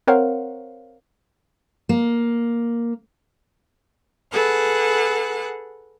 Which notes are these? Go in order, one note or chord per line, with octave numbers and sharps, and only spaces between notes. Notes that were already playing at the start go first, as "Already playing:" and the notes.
C4 A#4 C5 C#5 F5 F#5
A#3
G#4 A4 B4 F#5